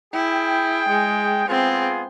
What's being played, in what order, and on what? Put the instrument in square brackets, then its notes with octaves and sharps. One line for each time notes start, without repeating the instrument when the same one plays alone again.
[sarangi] E4 [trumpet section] G#4 G5
[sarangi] G#3
[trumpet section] B3 F4 G#4 [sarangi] C4